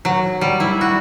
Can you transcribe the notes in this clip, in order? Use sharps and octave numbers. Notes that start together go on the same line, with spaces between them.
F#3
G3
E4
F#4